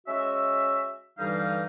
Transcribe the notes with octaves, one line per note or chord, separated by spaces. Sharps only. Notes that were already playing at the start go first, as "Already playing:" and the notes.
G#3 C#4 F#4 E5
G2 D3 E3 G3 D#4 F5